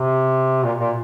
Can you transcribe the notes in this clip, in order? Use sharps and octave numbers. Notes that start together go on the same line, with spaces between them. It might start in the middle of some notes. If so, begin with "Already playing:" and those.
Already playing: C3
A#2
A#2